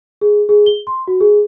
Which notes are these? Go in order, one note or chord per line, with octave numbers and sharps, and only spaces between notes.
G#4
G#4
G7
C6
F#4
G#4